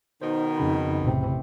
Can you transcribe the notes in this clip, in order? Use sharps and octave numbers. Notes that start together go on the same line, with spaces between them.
B2 D#3 D#4 C5
F2 C#3 B5
A1 C3